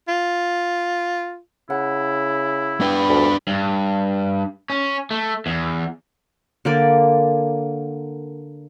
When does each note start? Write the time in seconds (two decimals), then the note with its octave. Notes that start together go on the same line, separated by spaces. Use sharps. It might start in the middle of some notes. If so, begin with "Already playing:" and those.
0.08 F4
1.70 C#3 E4 F#5
2.81 B3 D4 B4 G5
3.09 D2 B5
3.47 G2
4.70 C#4
5.11 A3
5.46 E2
6.65 D3 A#3 D5